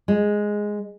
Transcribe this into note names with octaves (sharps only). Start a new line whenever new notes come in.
G#3